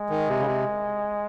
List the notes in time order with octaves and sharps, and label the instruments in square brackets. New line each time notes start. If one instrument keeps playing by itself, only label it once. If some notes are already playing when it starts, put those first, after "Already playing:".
Already playing: [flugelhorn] G#3
[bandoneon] D#3
C3
C#3
C3